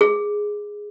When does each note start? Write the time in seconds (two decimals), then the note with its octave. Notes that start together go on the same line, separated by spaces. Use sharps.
0.01 G#4